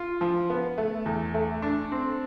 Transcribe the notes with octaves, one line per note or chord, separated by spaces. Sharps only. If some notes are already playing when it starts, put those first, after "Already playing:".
Already playing: F4
F3
B3
A3
E2
A3
D4
C4